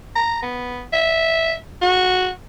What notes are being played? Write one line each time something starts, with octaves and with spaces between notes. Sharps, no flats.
A#5
B3
E5
F#4